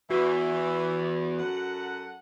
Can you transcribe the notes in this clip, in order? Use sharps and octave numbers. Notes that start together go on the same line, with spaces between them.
E2 E3 F#4
F#2 A4 F#5